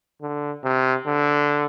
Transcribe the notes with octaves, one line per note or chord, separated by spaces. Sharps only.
D3
C3
D3